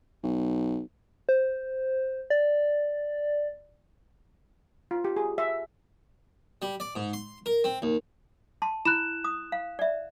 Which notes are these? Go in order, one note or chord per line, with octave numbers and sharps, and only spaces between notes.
B1
C5
D5
F4
G4
G#4
E5
G3
D5
G#2
C6
A#4
C4
D#2
A5 C6
E4 B5 F#6 E7
D#6
F5
D5 E5